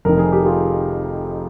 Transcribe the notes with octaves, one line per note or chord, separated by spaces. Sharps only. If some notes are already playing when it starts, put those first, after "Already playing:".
F1 F2 D#3 A#4
G#4
G4
F4 G#4